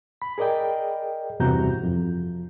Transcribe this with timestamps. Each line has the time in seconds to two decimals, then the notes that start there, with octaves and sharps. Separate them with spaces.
0.22 B5
0.38 G#4 A#4 D5 D#5 G5
1.40 E2 G2 C3 F#4 A#5 G6
1.83 F2